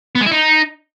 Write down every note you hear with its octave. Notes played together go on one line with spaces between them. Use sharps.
B3
G#3
E4
D#4